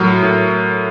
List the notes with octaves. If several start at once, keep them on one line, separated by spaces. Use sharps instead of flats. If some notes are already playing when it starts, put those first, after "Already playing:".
Already playing: A2 F#3 A#4
A2